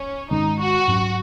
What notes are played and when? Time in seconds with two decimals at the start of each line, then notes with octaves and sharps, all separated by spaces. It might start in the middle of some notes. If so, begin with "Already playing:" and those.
Already playing: C#4
0.31 G#2 D#3 G#3 C#4 D#4
0.59 F#4
0.88 G#2 F#3 C#4